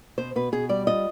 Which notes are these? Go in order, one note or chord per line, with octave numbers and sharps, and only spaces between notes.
B2 C5
B2 B4
B2 G#4
G3 D5
F4 D#5